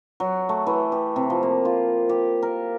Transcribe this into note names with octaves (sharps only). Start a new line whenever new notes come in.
F#3
A3
E3
G4
C3
F3
A#3
F4
G4
A#4